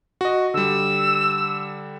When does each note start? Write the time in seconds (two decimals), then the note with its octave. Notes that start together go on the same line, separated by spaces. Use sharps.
0.21 F#4 D#5
0.54 D3 G3 E6